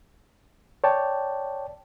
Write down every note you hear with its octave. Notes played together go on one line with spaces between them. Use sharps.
C#5 D5 G5 A5